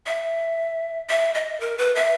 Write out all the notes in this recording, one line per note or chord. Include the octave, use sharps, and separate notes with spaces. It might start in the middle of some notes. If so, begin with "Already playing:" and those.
E5
E5
D#5
A#4
B4
E5